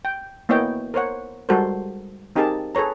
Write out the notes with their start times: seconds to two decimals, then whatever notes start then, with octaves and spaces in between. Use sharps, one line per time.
0.05 G5
0.49 A#3 B3 E4 C#5 D#5 G5
0.94 A#4 C5 C#5 F#5
1.49 G3 G#3 F#4 A4 A#4 C5
2.36 C4 D#4 G4 G#4 A#4 A5
2.75 G#4 A4 B4 C#5 A#5